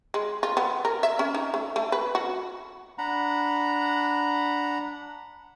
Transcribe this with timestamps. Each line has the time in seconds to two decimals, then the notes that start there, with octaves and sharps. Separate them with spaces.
0.14 G#3
0.43 F4
0.57 B3
0.85 A#4
1.03 E5
1.19 C#4
1.35 D#4
1.54 A3
1.76 A3
1.92 B4
2.15 F#4
2.98 D4 F#5 A#5 B5